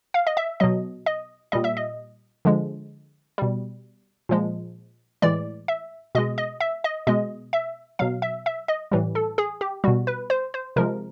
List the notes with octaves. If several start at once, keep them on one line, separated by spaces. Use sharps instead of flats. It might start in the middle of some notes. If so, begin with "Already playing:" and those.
F5
D#5
E5
B2 F#3 D#5
D#5
A#2 G3 D#5
E5
D#5
D3 F3 G#3
B2 G3
A#2 F3 G#3
A2 E3 G#3 D5
E5
B2 G#3 D#5
D#5
E5
D#5
B2 G#3 D#5
E5
B2 F#3 F5
E5
E5
D#5
A2 E3 G3
A4
G#4
G4
B2 G3 F#4
B4
C5
C5
C3 F3 G#3 A#4